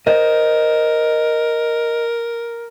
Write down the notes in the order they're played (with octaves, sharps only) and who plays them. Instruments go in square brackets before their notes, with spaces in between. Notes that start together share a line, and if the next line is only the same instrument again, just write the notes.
[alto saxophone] A#4 [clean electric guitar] C5 D#5